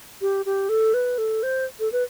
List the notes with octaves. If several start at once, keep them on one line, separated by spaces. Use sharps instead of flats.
G4
G4
A4
B4
A4
C5
A4
B4